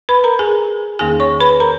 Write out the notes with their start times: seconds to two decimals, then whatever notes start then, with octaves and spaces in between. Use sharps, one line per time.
0.09 B4 B5
0.24 A#4 A#5
0.39 G#4 G#5
0.99 E2 D#3 A#3 D#4 G#4 G#5
1.20 C#5 C#6
1.40 B4 B5
1.60 A#4 A#5